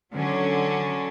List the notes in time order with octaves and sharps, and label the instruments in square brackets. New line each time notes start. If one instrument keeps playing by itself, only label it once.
[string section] D3 F#3 C#4